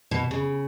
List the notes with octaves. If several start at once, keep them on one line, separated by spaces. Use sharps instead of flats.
B2
C#3